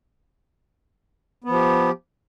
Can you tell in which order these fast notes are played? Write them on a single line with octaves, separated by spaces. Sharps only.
B3 F3 G4